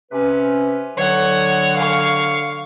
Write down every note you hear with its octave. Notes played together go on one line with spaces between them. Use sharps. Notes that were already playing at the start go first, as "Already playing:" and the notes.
C3 C#4 B4
D3 F#3 C#5 F#5
F5 C#6